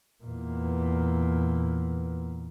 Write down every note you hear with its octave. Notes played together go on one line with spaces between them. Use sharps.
E2 A#2